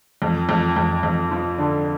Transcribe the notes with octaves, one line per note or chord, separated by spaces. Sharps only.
F2
F2
F2
F2
F3
D3